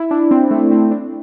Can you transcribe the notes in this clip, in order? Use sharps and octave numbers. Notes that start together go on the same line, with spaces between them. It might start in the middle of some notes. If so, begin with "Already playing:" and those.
Already playing: E4
D4
C4
A3
C4
D4